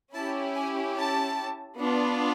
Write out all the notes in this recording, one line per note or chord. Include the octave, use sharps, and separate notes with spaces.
C#4 E4 G4 A5
G#5
A5
B3 D4 F4